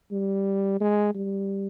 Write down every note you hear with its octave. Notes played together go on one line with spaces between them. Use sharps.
G3
G#3
G3